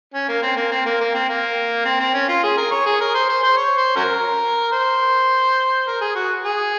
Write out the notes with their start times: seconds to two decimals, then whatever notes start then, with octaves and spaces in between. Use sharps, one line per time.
0.14 C#4
0.29 A#3
0.43 C4
0.57 A#3
0.72 C4
0.86 A#3
1.01 A#3
1.15 C4
1.29 A#3
1.86 C4
2.00 C4
2.14 C#4
2.29 F4
2.44 G#4
2.58 A#4
2.72 C#5
2.86 G#4
3.01 A#4
3.15 C5
3.30 C5
3.44 C5
3.58 C#5
3.77 C5
3.96 C#4 F#4 A#4
4.72 C5
5.87 A#4
6.01 G#4
6.15 F#4
6.45 G#4